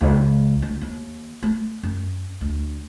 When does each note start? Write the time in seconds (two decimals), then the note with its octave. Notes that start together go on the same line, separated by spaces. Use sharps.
0.01 C#2
0.62 D2
0.81 D#2
1.43 A3
1.83 F#2
2.41 D2